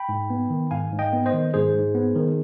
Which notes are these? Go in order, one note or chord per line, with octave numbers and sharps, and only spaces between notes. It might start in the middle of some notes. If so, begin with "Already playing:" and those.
Already playing: G5 B5
G#2
B3
D#3
G#2 F5 G#5
G#2
D#5 G5
B3
C5 D#5
D#3
G#2 G#4 C5
G#2
B3
D#3